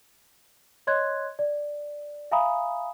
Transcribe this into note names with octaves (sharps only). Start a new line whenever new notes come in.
C#5 D#5 C6 F#6 G#6
D5
E5 F5 G#5 A#5 B5 D#6